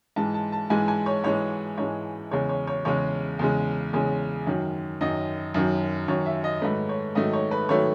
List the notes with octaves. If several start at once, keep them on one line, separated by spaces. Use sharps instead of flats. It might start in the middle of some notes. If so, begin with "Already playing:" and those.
G#2 E3 G#3 A5
A5
A5
G#2 E3 G#3 G#5
G#5
C#5
G#2 E3 G#3 C#5
G#2 E3 G#3 C#5
E2 C#3 G#3 C#5
C#5
C#5
E2 C#3 G#3 C#5
E2 C#3 G#3
E2 C#3 G#3
F#2 D#3 F#3
F#2 D#3 F#3 D#5
F#2 D#3 F#3
F#2 D#3 F#3 C#5
E5
D#5
G#2 D#3 F#3 A3 B4
C#5
G#2 D#3 F#3 A3 D#5
C#5
B4
D#3 F#3 A3 C#5